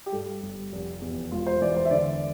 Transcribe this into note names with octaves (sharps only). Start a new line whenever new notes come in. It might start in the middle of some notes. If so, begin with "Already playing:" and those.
G4
G2 A4
G1
F1
E2
E1 F4
C5
E3 D5
C5
E5
D3 D5